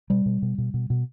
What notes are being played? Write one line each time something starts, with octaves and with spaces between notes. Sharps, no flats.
B2 G3
B2
B2
B2
B2
B2